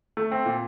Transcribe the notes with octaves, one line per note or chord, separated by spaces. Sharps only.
A3
C4
A#2